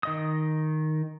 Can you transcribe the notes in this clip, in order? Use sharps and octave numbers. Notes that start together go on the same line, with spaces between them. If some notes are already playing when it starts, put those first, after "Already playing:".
D#3 D#5 D#6